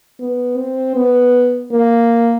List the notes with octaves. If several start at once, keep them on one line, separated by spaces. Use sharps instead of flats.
B3
C4
B3
A#3